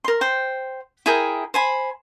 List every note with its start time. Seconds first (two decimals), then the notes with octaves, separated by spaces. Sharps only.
0.04 A#4 C6
0.21 C5 G5
1.06 E4 G#4 A#4 G5
1.54 C5 G#5 B5